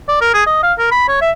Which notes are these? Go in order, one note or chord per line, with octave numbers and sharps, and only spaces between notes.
D5
A#4
G#4
D#5
F5
A#4
B5
C#5
E5